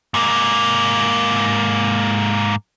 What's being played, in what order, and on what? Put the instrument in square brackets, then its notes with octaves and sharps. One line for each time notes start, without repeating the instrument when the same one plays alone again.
[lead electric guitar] G#2 A#3